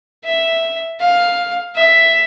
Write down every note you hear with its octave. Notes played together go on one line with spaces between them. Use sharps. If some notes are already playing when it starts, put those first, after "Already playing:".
E5
F5
E5